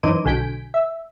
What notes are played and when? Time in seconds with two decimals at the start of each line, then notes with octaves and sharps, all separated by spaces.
0.03 F#2 E3 D#4 C5 D6 D#7
0.25 B1 D3 G#5 G6 B6 D7
0.74 E5